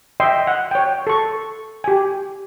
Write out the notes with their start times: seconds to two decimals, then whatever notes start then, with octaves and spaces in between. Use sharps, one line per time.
0.20 D#5 E5 G5 C6
0.47 F#5
0.71 C#5 G5
1.07 A4 C#6
1.84 G4 G#5